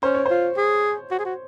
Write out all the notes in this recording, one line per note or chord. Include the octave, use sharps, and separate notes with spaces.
C#4 C5
C#5
F4 C5
G#4
F#4
G#4
F#4